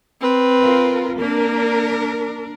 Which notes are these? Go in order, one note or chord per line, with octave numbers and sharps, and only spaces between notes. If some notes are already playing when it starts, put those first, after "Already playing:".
C4 B4
F4 A#4
A#3 D4 A#4